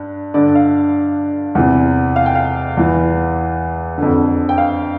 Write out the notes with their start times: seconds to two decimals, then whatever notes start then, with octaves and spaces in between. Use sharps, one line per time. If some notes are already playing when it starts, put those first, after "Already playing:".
Already playing: G2
0.34 G2 D3 D5
0.55 F5
1.55 E2 C3 E3
2.16 F5
2.26 G5
2.35 F5
2.77 E2 E3
3.98 F2 D3
4.49 G5
4.58 F5